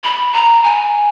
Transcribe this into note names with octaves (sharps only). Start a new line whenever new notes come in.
B5
A#5
G#5